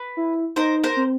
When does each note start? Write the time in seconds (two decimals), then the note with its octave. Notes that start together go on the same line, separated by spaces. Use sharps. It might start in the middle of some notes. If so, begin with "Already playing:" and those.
Already playing: B4
0.17 E4
0.56 D#4 A#4 C5
0.84 A#4 C5
0.97 C4